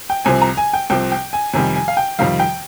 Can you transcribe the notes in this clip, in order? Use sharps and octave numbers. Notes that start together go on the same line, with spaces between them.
G5
C2 C3 F3 C4 G#5
A#5
G#5
G5
C2 C3 F3 C4 G5
G5
G#5
F2 C3 D#3 G3 G#5
G#5
F5
G5
F2 C3 D#3 G3 F5
G5